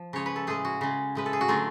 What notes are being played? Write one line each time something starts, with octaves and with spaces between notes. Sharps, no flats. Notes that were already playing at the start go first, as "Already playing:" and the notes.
Already playing: F3
C#3 G#3 C#5
B4
A4
A2 G#3 G#4
F#4
C#3 G#3
A2 G#3 B4
A4
G#4
F#4
D3 F#3 A3 F4